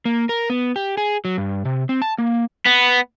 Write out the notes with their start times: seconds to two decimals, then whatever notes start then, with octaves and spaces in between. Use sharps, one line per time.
0.05 A#3
0.29 A#4
0.50 B3
0.76 G4
0.97 G#4
1.25 F#3
1.38 G2
1.65 C3
1.89 C4
2.02 A5
2.18 A#3
2.66 B3